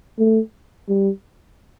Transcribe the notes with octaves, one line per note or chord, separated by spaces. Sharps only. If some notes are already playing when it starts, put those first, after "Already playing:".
A3
G3